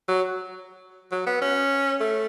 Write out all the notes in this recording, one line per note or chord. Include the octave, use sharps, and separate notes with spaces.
F#3
F#3
B3
C#4
A3